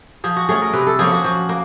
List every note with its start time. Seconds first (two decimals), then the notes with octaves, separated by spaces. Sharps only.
0.24 F3 G#4
0.36 F#4
0.49 A3 C#4 G#4
0.62 A#4
0.73 C3 B4
0.87 A4
0.99 F3 A#3 C#4 G#4
1.12 F#4
1.24 F3 F#4
1.49 A#3